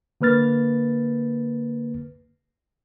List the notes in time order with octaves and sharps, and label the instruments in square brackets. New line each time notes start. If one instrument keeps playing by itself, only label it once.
[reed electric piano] D3 A#3 B4 F6 A6